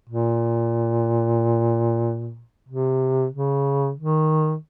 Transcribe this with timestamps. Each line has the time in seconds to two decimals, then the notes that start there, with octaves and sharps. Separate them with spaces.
0.10 A#2
2.69 C3
3.33 C#3
3.97 D#3